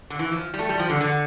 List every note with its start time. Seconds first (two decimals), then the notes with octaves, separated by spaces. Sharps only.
0.10 D3
0.19 E3
0.32 F3
0.54 G3
0.59 A3
0.69 G3
0.79 F3
0.90 D3
1.01 D3